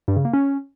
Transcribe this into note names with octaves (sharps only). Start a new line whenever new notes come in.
G2
C#3
A#3
C#4